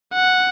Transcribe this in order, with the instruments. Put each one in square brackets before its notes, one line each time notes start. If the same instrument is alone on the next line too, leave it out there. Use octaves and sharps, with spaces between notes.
[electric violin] F#5